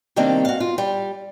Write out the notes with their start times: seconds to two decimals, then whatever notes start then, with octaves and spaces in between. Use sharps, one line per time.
0.16 C3 D#3 G3 A#3 C4 D4
0.45 F#4 F5
0.60 F4
0.78 G3